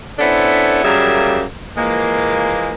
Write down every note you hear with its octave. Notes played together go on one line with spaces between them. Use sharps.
B3 C#4 D4 E4 A4 C5
F#2 C#3 G3 A#3 G#4 E5
E3 F3 G#3 A#3